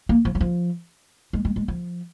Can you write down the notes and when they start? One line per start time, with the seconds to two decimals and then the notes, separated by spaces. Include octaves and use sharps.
0.09 A#3
0.25 F3
0.35 F#3
0.41 F3
1.33 G#3
1.45 G#3
1.56 G#3
1.68 F3